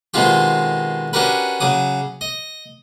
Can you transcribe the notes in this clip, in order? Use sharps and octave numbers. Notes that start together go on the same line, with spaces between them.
B2 D#3 G#3 C4 F4 G4
C#4 D4 F#4 G4 A#4 B4
C#3 F#3 D6 D#6
D#5